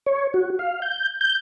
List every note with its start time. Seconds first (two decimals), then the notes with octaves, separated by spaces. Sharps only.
0.06 C#5
0.34 F#4
0.59 F5
0.82 G6
1.21 G6